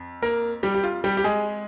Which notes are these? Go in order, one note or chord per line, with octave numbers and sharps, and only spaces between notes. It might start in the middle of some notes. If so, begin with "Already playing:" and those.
Already playing: F2
A#3 A#4
G3 G4
G4
F4
G3 G4
G4
G#3 G#4